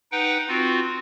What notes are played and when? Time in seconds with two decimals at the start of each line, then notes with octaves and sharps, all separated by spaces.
0.12 D#4 B4 F#5 G5
0.48 C4 F4 F#4